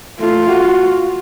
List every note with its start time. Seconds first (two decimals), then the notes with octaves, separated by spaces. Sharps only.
0.20 A3 F4
0.48 F#4